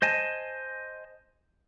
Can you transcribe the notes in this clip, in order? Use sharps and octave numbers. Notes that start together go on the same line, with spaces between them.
C5 D#5 G#5 A5